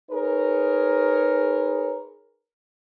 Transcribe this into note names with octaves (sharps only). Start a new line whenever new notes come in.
D#4 G#4 A#4 B4 C#5